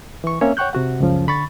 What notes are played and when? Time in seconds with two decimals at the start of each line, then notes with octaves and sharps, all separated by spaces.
0.24 E3 C#6
0.41 A#3 C4 C#4 C#5 E5
0.57 C#5 F#5 G5 C#6 F#6 G6
0.73 C3 F#4 F#5
1.00 C#2 F#2 C#3 F3 C#4
1.27 D3 B5 C#6 A6